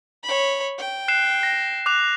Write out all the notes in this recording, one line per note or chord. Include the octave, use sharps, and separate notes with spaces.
C#5 B5
G5
F#6 C7 E7
A#6
D6 F#6 F7